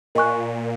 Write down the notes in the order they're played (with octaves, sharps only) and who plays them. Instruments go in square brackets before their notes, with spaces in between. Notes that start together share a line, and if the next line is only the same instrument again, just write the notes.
[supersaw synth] A#2 [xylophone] A#4 D#5 G#5 C#6 F#6